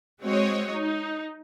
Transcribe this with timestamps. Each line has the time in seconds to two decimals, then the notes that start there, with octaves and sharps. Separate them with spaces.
0.22 G#3 C4 F#4 C#5 D#5
0.74 D#4